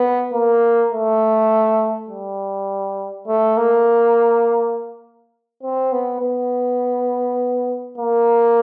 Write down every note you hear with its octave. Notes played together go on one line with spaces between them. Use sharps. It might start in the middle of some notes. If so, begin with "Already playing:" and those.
Already playing: B3
A#3
A3
G3
A3
A#3
C4
B3
B3
A#3